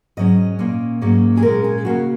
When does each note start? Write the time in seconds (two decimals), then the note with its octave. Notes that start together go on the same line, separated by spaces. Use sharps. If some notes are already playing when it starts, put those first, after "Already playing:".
0.17 G#2 F#3 C#4 D#5
0.59 A#2 A#3 C#4
1.01 G#2 F#3 A#3 C#4
1.37 G#4
1.43 A#2 G#3 C#4 A#4
1.64 G#4
1.85 C#3 A#3 C#4 F#4